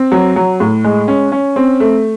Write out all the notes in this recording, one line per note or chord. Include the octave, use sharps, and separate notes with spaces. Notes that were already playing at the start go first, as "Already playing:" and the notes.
Already playing: C4
F#3
F#3
A2
G#3
C#4
C#4
C4
A3